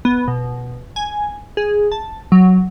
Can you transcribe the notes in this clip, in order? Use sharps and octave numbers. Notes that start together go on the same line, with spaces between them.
B3
B2
G#5
G#4
A5
F#3